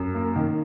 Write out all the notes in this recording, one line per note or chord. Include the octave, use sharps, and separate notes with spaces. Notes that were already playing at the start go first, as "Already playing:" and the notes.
Already playing: F#2
A#3
D#3